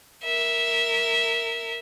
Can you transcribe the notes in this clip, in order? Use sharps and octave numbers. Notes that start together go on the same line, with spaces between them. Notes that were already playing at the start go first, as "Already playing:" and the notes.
A#4 E5